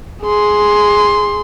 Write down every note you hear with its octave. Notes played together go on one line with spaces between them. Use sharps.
G#4 C6